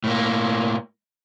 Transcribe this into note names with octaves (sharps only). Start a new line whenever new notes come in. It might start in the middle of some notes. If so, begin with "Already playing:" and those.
A2 A#3